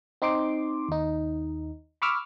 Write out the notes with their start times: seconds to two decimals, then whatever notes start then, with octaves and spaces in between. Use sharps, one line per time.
0.22 C4 D#4 C6 D6
0.89 D#2 D#4
2.02 B5 C#6 D6 E6 F6